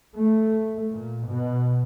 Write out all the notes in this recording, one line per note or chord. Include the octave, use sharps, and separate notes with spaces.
A3
A#2
B2